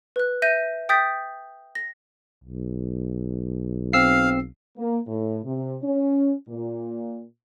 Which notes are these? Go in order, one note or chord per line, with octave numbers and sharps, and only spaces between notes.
B4 F#6
E5 G6 A#6 D#7
G5 D#6 G6 A6 B6
A#6
B1
C4 F5 E6 C7
A#3
A2
C3
C#4
A#2